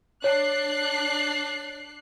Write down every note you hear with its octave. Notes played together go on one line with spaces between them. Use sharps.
D4 C#5 F#6 C7